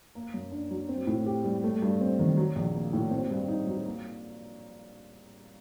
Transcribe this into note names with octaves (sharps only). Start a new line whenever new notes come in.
A#3
F#2
D4
F#3
C4
A2
G4
G3
A3
G2
C4
D#3
F#3
A#1
A#3
A2
C4
G2
D#4
F#3
A#3